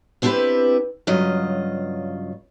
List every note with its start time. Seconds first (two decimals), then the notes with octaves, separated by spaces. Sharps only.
0.22 B3 C4 D4 E4 G4 B4
1.07 G2 C#3 F#3 F4 D#5